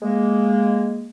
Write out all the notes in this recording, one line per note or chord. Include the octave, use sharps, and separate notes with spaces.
G#3 A#3